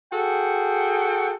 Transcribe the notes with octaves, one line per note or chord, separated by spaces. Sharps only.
F#4 G#4 A4 G5